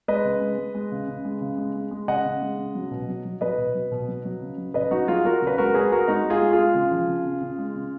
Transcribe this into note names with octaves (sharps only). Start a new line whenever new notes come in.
G#3 B4 D#5
C#3
G#3
G#3
G#3
C#3
C#3
G#3
C#3
G#3
G#3
G#3
C#3 D#5 F#5
C#3
G#3
C#3
F#3
B2
F#3
F#3
F#3 B4 D#5
B2
F#3
B2
F#3
F#3
C#3
F#3
C#3 B4 D#5
F#3 D#4 F#4
F#3 F4 G#4
F#3 F#4 A#4
C#3 B4
G#3 F#4 A#4
G#3 G#4 B4
G#3 F#4 A#4
G#3 D#4 F#4
G#3
F4 G#4
G#3
F4 G#4
G#3
C#3
F3
C#3
C#3
C#3
G#3
C#3